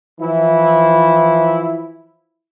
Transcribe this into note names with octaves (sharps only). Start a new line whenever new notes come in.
E3 F3 E4